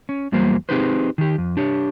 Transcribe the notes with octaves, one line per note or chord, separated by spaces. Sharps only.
C#4
E2 F#3 G3 A#3 C5
C4 D#4 G4 G#4 B4 C5
D#3 G4
F2
D4 G4 C#5